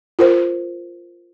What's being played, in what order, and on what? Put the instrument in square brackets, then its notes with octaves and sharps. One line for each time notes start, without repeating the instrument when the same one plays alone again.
[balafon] F4 A#4 C5